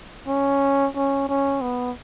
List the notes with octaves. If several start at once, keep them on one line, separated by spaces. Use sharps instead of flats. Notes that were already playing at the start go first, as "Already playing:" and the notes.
C#4
C#4
C#4
B3